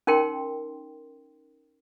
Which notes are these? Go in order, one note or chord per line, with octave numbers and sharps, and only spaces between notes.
C#4 D#4 A#4 G5 C6